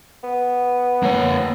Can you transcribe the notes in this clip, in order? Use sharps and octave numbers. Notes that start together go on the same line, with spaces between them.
B3
A#3 C#5